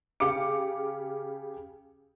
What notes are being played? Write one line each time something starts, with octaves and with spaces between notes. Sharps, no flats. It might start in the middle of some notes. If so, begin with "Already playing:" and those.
C#3 G4 F5 D6 C#7